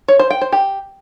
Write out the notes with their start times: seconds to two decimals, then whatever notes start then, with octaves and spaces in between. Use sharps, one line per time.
0.08 C#5
0.19 C5
0.30 G5
0.41 C5
0.53 G4